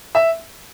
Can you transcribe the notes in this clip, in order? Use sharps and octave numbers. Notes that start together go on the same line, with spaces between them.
E5